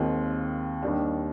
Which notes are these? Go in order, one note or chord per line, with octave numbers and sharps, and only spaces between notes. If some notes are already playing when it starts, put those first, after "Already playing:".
Already playing: D#2 D#3 G#3 C4 F4
D#2 D#3 G3 D4